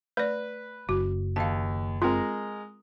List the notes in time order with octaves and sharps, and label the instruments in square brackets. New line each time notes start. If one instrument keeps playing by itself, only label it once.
[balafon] A3 D5 [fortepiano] B4 [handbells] G6
[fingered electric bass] F#1 [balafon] F#4
[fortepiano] D#2 [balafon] F5 A5
[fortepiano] G#3 A#4 [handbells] C4 F4